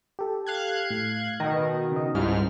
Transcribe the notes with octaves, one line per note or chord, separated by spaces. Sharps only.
G4 A4
F5 F#6 G#6
A2
B2 D#3 A#6
C#3 D#5
C#2 G#2 G3 E4 F6